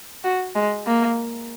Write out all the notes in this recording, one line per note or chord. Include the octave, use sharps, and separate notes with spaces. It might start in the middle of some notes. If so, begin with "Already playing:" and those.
F#4
G#3
A#3